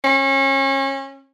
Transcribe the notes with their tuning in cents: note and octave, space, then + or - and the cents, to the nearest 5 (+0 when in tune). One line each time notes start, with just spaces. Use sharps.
C#4 -30